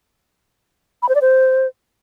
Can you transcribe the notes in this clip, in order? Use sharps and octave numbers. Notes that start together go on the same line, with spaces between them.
B5
C5
D5
C5